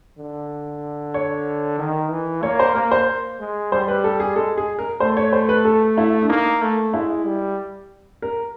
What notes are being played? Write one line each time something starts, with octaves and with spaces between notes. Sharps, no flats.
D3
C#5
D#3
E3
A#3 C#5
C5
A#3 A#4
C5
G#3
G3 C5
B4
A4
G#4
G#3 A4
G#4
A#4
A3 C5
C#5
C5
B4
A4
E4
D4
A#3 D#4
A3
G#3 E4
G3
A#4